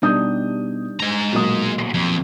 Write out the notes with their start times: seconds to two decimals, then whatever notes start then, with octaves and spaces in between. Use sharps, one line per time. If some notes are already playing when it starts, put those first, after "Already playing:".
0.02 B2 G3 D4 D#4 D#6 G6
1.00 G#3 A#5
1.32 B1 A#2 D#6
1.94 F2